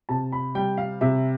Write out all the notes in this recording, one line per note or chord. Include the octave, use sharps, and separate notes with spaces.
C3 A5
B5
G3 G5
F5
C3 E5